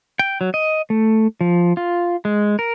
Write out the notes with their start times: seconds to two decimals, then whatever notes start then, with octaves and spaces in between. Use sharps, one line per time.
0.19 G5
0.41 F#3
0.54 D#5
0.90 A3
1.41 F3
1.77 F4
2.25 G#3
2.59 A#4